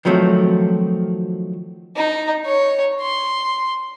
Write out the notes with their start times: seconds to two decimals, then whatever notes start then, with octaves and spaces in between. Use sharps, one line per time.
0.05 D#3 F3 F#3 A3 C4
1.96 D#4
2.46 C#5
3.01 C6